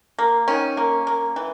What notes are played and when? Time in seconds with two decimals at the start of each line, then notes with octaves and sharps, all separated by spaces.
0.19 A#3
0.48 D#3 C#4
0.77 A#3
1.07 A#3
1.36 E3